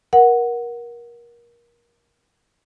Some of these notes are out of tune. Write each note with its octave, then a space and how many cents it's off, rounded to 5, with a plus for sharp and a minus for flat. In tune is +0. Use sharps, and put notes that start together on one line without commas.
A#4 +25 F#5 +0